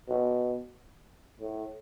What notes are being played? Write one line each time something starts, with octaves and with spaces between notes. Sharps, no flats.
B2
A2